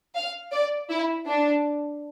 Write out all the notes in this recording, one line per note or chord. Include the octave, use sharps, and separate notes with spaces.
F5
D5
E4
D4